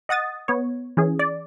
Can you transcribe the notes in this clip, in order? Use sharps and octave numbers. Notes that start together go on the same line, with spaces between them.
D#5 F#5 D#6 A6
B3 C#5
E3 C#4 G#4
D5